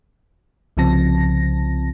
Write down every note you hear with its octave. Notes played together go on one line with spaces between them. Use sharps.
C2 C#3 F3 C4 A5 A#6